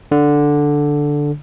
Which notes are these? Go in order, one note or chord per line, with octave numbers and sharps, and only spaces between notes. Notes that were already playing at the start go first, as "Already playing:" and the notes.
D3